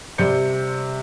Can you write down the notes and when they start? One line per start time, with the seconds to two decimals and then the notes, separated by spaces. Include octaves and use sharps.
0.18 C3 G3 C5 D5 G6 C#7